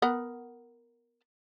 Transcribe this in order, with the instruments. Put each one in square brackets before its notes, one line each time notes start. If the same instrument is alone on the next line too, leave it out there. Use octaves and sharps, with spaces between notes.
[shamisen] B3 A#4 F#5